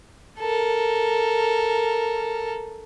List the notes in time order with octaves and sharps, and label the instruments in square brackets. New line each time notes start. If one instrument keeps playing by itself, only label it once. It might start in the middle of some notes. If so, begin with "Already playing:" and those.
[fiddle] A4 A#4